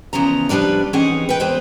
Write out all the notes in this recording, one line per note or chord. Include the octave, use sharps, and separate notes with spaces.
E2 C#3 E3 F3 A#5
F3 G3 D4 B4 D5
E3 C4 C#4 D#4 G#4 F#5
B4 G5
E2 B4 C5